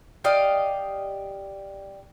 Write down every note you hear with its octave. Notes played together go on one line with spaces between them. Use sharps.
G4 D5 D#5 F5